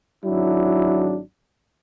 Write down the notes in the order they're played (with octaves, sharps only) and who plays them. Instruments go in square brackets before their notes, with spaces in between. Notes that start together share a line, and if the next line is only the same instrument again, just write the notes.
[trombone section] G#1 F#3 D4 E4